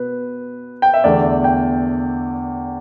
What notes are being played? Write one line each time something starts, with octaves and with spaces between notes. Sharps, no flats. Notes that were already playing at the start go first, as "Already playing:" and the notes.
Already playing: B2 B3 B4
G5
E5
E2 D3 A3 D5
G5